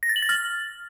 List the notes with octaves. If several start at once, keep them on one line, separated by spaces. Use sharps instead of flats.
A#6
A6
F#7
A6
F6